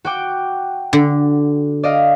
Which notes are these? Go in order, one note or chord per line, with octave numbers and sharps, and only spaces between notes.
F#4 G5 D6
D3
D5 D#5 F5